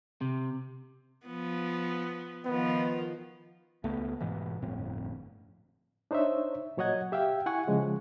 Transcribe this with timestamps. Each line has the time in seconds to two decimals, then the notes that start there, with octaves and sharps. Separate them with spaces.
0.21 C3
1.26 F3 B3
2.46 D#3 F3 B3 F4
3.84 C#2 A3 B3
4.20 G#2 B2 E3
4.62 G1 F2 A2 C4
6.11 D4 D#4 C5 C#5 E5
6.77 A#2 F#3 C#5 D#5 F#5 G#6
7.12 G4 E5 F5 G5
7.46 E4 F#5 G#5 C#6
7.67 C#3 F3 G#3